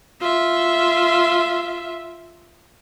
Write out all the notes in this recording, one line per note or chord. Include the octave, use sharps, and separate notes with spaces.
F4 E5